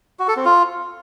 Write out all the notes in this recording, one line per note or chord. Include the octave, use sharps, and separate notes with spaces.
F#4
A4
C4
F4